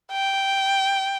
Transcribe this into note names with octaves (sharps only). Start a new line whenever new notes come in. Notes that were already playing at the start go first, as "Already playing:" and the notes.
G5